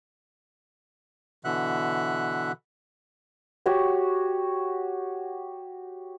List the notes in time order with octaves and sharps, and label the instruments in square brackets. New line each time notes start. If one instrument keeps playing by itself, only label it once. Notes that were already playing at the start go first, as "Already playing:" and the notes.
[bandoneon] B2 D3 E3 E5 F#5 F#6
[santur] F#4 G4 C#5 F#5